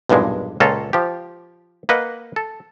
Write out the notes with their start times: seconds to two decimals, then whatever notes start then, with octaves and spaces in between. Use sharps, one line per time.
0.09 B1 E2 G2 A#2 G#3
0.60 C#2 A#2 C#4 F4 A4 A#5
0.93 F3 G4
1.89 A#3 B4 D#5 F#5
2.36 A4